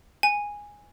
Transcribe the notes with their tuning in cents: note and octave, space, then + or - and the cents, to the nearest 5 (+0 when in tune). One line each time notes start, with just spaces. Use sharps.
G#5 -10